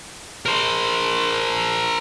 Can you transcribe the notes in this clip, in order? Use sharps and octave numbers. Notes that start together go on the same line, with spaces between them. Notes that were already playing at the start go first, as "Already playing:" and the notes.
A#4 C5